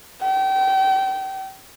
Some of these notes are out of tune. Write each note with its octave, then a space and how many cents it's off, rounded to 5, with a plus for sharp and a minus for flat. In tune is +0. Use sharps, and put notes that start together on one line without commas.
G5 -30